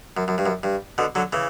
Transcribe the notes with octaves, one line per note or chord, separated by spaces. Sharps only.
F#2
F#2
G2
F#2
G2
B2 D3
D3 F#3
C#3 E3